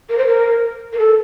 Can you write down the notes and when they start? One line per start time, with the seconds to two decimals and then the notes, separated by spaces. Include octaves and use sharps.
0.09 A#4
0.18 C5
0.27 A#4
0.93 A#4
0.99 A4